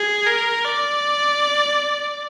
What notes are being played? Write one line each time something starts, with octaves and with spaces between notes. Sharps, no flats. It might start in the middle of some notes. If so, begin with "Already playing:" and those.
Already playing: G#4
A#4
D5